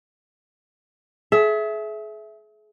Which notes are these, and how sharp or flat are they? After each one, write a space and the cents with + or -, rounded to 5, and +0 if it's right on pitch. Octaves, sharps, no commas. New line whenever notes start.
G#4 +40 E5 +0